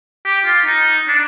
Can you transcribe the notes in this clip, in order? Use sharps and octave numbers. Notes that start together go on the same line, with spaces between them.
G4
F4
D#4
D4